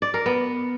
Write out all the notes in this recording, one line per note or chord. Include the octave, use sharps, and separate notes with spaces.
D5
A#4
B3